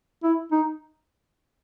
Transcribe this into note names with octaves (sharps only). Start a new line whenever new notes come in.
E4
D#4